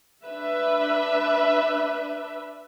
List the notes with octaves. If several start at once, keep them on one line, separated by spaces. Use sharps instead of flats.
D4 B4 E5